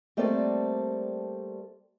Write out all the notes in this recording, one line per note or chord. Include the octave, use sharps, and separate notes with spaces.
G3 A3 A#3 C4 A4 D5